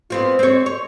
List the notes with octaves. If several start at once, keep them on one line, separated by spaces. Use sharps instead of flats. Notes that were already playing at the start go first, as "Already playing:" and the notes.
B3 C4 F4
C4 C#5
C#5